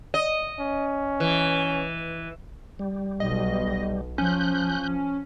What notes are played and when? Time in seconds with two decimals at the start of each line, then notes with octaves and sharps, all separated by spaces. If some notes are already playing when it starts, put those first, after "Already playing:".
0.14 D#5
0.59 C#4
1.20 E3
2.79 G3
3.20 B1 B2 D#5
4.18 F3 C#4 F#6 G6